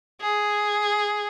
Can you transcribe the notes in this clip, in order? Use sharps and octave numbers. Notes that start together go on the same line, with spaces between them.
G#4